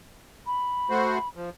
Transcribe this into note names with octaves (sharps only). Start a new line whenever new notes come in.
B5
A3 F#4 C5
F3